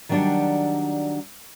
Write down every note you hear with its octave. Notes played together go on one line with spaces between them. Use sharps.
D#3 F#3 G3 D4 D5 F#5